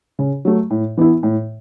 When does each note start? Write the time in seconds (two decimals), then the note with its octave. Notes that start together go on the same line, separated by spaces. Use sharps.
0.19 C#3
0.45 F#3 A3
0.70 A2
0.97 E3 B3 E4
1.23 A2